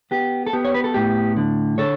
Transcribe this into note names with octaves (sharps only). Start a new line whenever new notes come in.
B3 G4
A4
B3 G4
C#5
B4
A4
A2 G4
D3
D3 A4 C#5